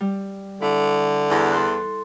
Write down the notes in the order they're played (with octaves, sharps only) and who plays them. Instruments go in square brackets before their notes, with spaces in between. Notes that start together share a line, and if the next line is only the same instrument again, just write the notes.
[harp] G3
[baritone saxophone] D3 [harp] E4
[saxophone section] E2
[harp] A4 C6 F#6